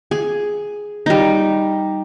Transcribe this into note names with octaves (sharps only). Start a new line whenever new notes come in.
G#4
G3 D#4